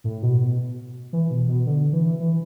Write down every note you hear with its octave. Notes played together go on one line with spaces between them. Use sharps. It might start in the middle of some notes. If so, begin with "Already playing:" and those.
A2
B2
B2
E3
B2
B2
D3
E3
E3